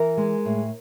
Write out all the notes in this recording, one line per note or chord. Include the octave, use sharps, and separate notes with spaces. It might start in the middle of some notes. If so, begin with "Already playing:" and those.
Already playing: E3 A#4
G#3
A2